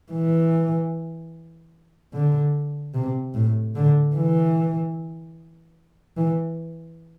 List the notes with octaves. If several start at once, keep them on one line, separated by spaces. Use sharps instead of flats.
E3
D3
C3
A2
D3
E3
E3